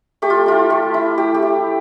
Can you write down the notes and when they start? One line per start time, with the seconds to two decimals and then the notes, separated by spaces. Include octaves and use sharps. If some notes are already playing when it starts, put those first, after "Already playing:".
0.22 A3 G4
0.30 F4
0.46 E4 F4
0.70 A3
0.94 E4
1.18 A3 G4
1.34 G4
1.42 E4